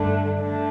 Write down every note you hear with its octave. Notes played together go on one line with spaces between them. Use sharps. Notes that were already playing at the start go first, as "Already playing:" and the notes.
Already playing: G2 D3 A3 D4
D3 A3 D4